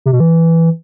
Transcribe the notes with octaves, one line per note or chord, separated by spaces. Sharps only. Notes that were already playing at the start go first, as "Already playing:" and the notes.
C3
B2
E3